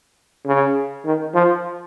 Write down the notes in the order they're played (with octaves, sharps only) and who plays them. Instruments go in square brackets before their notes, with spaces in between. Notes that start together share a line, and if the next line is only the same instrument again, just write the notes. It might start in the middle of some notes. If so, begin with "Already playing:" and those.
[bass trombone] C#3
D#3
F3